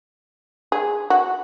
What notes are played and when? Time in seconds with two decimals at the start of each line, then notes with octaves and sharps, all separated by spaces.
0.72 G#4
1.10 F#4